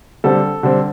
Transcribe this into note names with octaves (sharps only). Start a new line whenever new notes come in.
D3 G3 C4 A4
D3 G3 C4